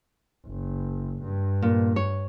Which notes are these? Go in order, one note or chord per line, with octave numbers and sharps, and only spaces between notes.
F#1
G2
A#2
C#5